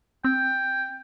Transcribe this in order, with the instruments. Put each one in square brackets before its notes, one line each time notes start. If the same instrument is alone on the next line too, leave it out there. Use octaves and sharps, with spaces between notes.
[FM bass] C4 [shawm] G5